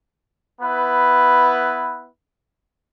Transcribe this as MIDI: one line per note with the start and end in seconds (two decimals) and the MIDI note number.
0.60 2.08 59
0.60 2.08 64
0.60 2.08 71